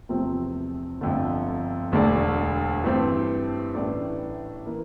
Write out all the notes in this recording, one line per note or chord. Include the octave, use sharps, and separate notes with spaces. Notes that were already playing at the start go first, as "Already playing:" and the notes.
E2 C3 F3 A3 C4
G1 F2 D3 A3
E1 D2 D3 A3 D4
G2 E3 A3 C4 G4
A1 A2 E3 A3 D4
E3 A#3